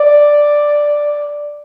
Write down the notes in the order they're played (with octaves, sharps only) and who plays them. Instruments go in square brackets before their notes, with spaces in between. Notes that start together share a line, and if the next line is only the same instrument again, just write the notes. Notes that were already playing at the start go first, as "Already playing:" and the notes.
Already playing: [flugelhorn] D5